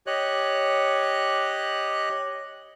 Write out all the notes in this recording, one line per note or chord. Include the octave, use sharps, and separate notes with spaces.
G4 C#5 D#5 F#6